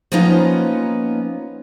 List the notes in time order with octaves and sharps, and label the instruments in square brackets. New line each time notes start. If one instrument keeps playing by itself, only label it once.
[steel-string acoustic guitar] F3 A#3 B3 C#4 D#4 F4